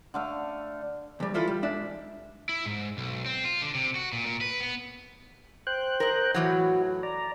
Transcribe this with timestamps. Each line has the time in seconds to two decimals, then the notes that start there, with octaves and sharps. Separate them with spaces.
0.14 D3 A3 F5
1.20 D2 G3
1.34 E3 E4 F4 A4
1.48 G3
1.63 G#2 D4 E5
2.49 E4
2.65 G#2
2.98 B1
3.26 C4
3.45 F4
3.62 D3
3.75 C3
3.95 F#4
4.13 A#2
4.26 A#2
4.41 B4
4.60 B3
5.67 C5 G5 F#6
6.00 A#4 D#5
6.35 A2 E3 F#3 F#4
7.03 D5 A#5